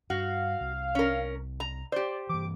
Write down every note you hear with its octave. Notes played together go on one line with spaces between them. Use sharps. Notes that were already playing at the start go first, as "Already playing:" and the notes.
G2 F#4 F5
C2
C#4 A#4
A#5
G4 C5 D5
G2 E3 D6